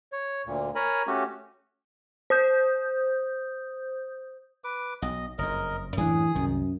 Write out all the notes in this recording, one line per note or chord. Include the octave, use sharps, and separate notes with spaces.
C#5
D2 A#2
A#4 C#5 G#5 A#5 B5
A3 C#4 F#4 G4
C5 D#6 G6
B4 D6
B1 D#5
F#1 F2 A#4 D#5
F#2 A2 E3 D4 G#4 D#6
C2 F#2 D#3